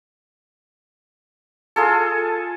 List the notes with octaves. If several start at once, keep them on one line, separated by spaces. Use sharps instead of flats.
F4 G#4 A4